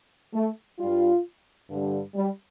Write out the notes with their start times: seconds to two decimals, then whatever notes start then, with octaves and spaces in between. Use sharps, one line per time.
0.34 A3
0.79 G2 G3 F4
1.69 G2 D3 G3
2.15 G3